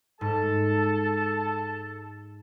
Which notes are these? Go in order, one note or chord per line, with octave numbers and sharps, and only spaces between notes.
G#2 A4 A5